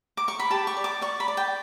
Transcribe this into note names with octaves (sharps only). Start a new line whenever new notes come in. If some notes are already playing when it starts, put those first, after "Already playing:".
D6
C#6
B5
G4 A5
C#6
D5
D6
D5 C#6
B5
D5
G5